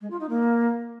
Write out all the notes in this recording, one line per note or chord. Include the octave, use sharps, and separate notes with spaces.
G#3
F4
D#4
A#3